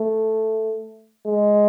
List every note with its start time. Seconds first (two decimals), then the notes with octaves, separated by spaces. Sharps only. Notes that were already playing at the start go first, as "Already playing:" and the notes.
Already playing: A3
1.27 G#3